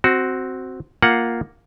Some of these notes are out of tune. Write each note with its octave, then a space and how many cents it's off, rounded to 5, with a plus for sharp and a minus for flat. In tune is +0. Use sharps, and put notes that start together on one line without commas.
C4 +0 F#4 +5
A#3 +0 F4 +0 F#5 +0